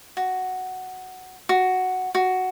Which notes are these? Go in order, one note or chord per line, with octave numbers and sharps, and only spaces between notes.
F#4
F#4
F#4